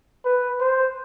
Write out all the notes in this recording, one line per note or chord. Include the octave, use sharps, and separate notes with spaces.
B4
C5